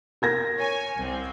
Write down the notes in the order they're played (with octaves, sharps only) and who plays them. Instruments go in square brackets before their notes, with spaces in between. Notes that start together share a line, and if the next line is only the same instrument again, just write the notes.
[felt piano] A#4 G#6 A#6
[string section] C#5 G#5
C2 C4